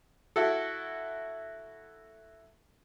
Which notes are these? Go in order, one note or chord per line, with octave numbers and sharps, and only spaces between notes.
E4 F#4 A4